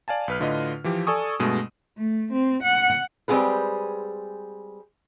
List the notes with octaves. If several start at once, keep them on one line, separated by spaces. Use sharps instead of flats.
D5 F5 G#5 A5
B1 B4 F6
A2 D3 F4 B4 D#5
E3 F3 G4
A4 D5 G#5 C#6 D#6
G2 B2 G#3 A3
A3
C4
F#5
G3 G#3 C4 F4 G#4 B4